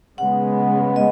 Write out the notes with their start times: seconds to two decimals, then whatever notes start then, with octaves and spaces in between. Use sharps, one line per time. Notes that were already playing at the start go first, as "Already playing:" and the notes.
0.18 C#3 G#3 B3 F#5
0.96 D#5